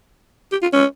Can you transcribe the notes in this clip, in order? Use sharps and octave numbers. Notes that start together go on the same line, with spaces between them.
G4
F4
C#4